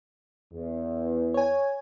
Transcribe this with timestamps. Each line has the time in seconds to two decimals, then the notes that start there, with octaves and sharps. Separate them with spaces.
0.52 E2
1.34 C#5 G#5